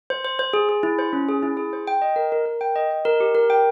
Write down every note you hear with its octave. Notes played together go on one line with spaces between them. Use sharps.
C5
C5
C5
G#4
G#4
E4
C5
C#4
G#4
E4
G#4
C5
G5
D#5
A#4
A#4
A#4
G5
D#5
D#5
A#4
G4
A#4
G5